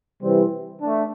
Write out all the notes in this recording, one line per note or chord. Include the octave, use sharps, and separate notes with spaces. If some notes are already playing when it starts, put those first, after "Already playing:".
C3 E3 G3 C4
A3 D4